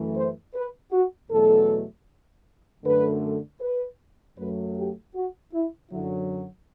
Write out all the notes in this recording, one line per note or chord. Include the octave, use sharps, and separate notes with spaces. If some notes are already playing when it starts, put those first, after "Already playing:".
Already playing: F#2 E3 A3
C5
B4
F#4
E2 B2 F#3 A3 A4
F#2 D3 A3 B4
B4
F#2 F#3 A3 B4
G4
F#4
E4
F#2 D3 F#3 E4